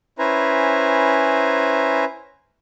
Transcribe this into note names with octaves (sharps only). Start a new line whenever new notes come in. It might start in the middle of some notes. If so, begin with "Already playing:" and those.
C#4 E4 B4 C5 G#5 A#5